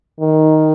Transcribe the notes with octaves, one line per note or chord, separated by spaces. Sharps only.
D#3